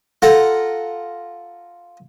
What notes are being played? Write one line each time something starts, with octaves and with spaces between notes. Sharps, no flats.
F4 A4 F#5 A#5